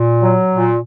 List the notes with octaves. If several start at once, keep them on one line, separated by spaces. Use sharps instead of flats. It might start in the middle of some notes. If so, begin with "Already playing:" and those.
Already playing: A#2
F#3
A#2